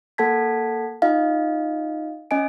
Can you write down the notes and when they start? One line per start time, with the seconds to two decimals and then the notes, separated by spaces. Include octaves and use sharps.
0.18 A#3 A4 F#5 A5 G#6 B6
1.02 D#4 F4 D#5 F5
2.31 C#4 D#5 G#5 D7